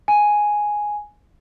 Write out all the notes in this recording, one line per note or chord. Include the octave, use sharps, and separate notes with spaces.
G#5